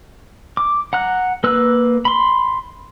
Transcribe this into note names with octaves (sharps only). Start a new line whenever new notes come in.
D6
F#5 A#5 F#6
A#3 B4 E6 F#6
B5 C6